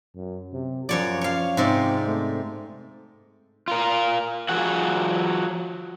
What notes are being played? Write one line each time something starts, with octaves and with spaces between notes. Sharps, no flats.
F#2
C3
F#2 F3 C#5 D5
C#5 F5
G#2 C3 C4 D5
A3
F4 A#4
F3 F#4 G#4 F#5